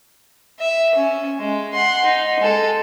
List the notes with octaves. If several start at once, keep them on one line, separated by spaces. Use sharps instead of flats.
E5
C#4
G#3
F#5 C6
D#4
G#3 A4